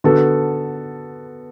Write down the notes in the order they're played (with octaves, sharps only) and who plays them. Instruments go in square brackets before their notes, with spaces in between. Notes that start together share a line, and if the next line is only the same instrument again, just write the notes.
[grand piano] D3 B3 F#4 A4